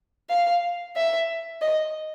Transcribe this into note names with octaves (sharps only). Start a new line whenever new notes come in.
F5
E5
D#5